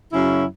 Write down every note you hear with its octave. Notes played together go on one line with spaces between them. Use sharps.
F#2 C#3 F#3 C#4 E4